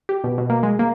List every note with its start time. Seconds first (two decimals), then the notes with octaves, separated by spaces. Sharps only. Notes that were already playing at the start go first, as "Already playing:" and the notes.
0.09 G4
0.24 B2
0.38 B2
0.50 A#3
0.63 G#3
0.79 A#3